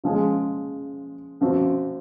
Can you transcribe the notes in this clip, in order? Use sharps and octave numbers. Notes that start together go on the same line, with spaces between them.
C#3 F3 G#3
F#2 F3 C4 F#4